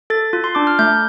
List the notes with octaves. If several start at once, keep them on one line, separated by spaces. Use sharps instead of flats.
A4 A6
F4
C6
D4 D6
F6
A3 G6